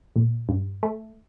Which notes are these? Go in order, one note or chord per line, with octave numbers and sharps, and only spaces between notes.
A#2
G2
A3